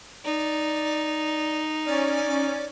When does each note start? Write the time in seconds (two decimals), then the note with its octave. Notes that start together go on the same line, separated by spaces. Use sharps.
0.25 D#4 D5
1.86 C#4 D5